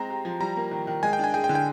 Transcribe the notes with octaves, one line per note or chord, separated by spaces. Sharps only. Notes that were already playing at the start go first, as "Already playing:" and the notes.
Already playing: G#3 C4 A#5
G4
F3
G3 A#5
A#3
D#3
D#3
G#3 G#5
G5
D4 G#5
G#4 G5
G5
D3
G5